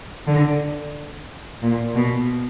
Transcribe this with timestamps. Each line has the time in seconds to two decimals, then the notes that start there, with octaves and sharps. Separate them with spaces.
0.27 D3
1.62 A#2
1.96 B2